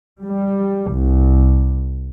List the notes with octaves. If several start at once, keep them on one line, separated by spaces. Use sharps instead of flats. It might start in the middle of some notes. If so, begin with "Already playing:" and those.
G3
C2